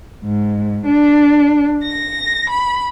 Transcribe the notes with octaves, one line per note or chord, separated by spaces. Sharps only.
G#2
D4
A#6
B5